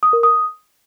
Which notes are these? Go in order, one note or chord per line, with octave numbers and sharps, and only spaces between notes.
D#6
A#4
D#6